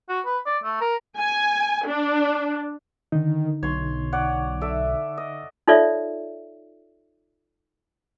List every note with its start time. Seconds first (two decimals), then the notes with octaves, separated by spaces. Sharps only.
0.09 F#4
0.25 B4
0.46 D5
0.64 A3
0.81 A#4
1.18 G#5
1.87 D4
3.12 D3 D#3 D#4
3.63 B1 C#5 C6
4.13 C#5 D5 F#5
4.61 A4 D5 E5
5.18 D#5
5.68 D#4 F4 A4 C#5 D5 E5